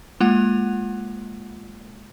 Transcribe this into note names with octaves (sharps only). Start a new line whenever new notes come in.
G#3 A#3 F4 F#5 F7